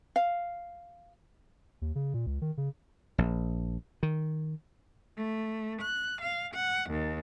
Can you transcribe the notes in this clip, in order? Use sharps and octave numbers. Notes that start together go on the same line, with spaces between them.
F5
D#2
C#3
A#2
C#2
D#3
C#3
A#1
D#3
A3
F#6
F5
F#5
D#2